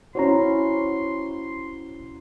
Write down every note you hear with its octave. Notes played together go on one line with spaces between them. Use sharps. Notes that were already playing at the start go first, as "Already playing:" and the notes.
C#4 E4 F#4 C5 C#5 A#5 C6